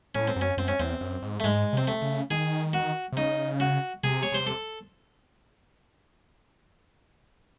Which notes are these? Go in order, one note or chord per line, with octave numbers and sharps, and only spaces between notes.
A2 C#4
C4
F#2
C#4
F#2 C4
C#4
E2 C4
F#2
G#2
A3
G#2 G#3
C3 C4
A3
C#3
D#3 G#4
F#4
C3
C#3 D#4
F#4
C3 G#4
C#5
C3 C5
A4